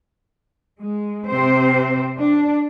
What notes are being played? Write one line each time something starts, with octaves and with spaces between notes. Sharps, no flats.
G#3
C3 C4 C5
D4